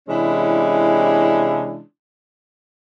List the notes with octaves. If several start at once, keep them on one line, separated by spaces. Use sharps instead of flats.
C3 E3 G#3 C#4 D4 E4